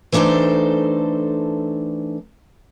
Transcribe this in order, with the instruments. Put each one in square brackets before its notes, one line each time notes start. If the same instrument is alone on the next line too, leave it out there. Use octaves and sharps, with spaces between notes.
[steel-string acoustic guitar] E3 A3 D4 D#4 A4 C5